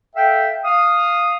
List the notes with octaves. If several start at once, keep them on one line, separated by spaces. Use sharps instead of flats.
A4 E5 F5 G5
F5 D#6